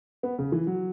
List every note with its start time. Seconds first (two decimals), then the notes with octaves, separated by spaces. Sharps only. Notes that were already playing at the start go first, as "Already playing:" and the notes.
0.23 B3
0.39 C#3
0.52 E3
0.67 F#3